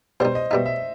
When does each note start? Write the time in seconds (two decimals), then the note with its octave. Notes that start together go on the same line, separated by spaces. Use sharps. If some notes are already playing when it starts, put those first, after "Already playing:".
0.20 B2 G3 D#4 C5
0.35 D#5
0.50 B2 G3 D#4 E5
0.66 E5